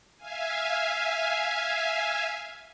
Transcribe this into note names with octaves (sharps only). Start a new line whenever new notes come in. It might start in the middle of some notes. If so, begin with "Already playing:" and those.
E5 F5 G#5